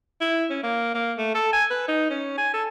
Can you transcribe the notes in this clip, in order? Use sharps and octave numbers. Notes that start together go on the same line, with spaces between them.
E4
C#4
A#3
A#3
A3
A4
G#5
B4
D#4
C#4
G#5
A4